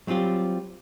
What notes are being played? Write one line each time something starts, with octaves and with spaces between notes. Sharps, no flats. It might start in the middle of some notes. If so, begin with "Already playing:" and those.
F#3 G3 C4 F4 G4